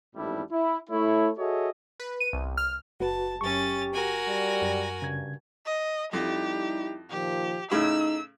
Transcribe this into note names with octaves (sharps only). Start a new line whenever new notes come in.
A1 F2 G#2 G3 D4 E4
E4
A3 E4 C#5
F#4 G#4 A4 C#5 D#5 E5
B4
D#7
C2
F6
F#1 F#4 B4 A5
F#2 C#4 G4 C#6 A6
F#4 A#4 G#5
G3
F#2
G2 C#3 G#6
D#5
F2 G3 D#4 E4 G4
A#2 D#3 F3 G4
A2 C#3 D#4 E6